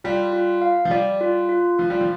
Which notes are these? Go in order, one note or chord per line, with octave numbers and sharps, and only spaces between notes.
G3 F4
F4
F5
F3
G3 D5
F4
F4
F3 F4
G3
F3